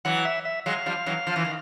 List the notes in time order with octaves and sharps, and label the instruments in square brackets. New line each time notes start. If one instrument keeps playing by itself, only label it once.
[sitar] E3 F#3 [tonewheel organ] F#5
[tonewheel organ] E5
E5
[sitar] F#3 G#3 [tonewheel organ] F5
[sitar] F3 G3
E3 F#3
F3
E3
D#3